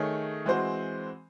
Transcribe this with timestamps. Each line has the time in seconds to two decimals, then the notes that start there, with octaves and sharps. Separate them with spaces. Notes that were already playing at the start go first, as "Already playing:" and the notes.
Already playing: D#3 A3 D#4 G#4 C#5
0.46 E3 G#3 C4 F#4 C5